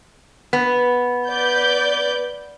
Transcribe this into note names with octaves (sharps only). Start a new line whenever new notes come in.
B3
B4 D5 G6